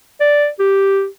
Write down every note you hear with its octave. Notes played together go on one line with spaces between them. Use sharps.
D5
G4